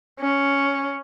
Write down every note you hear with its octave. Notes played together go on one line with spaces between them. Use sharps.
C#4